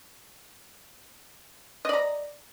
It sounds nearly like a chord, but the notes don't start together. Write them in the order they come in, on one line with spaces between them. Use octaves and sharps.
D#5 D5 A#5